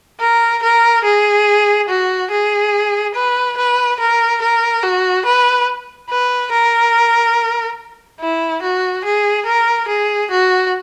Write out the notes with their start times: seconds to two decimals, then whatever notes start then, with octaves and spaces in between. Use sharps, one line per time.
0.20 A#4
0.63 A#4
1.05 G#4
1.89 F#4
2.31 G#4
3.15 B4
3.57 B4
4.00 A#4
4.42 A#4
4.83 F#4
5.26 B4
6.10 B4
6.52 A#4
8.20 E4
8.63 F#4
9.04 G#4
9.46 A#4
9.88 G#4
10.31 F#4